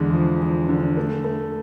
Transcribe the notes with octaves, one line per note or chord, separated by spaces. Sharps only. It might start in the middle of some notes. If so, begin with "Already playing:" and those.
Already playing: E2 D3 G#3
F3
F3
D3
A3
A3